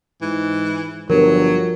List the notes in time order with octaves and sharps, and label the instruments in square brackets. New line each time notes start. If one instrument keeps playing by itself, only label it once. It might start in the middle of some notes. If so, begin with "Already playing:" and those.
[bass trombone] G#2 [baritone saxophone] E3
[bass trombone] G1 [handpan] F3 [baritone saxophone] F#3 [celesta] A#4